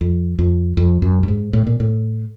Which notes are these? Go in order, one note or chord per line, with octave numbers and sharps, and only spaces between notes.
F2
F2
F2
F#2
G2
G#2
A2
A#2
A2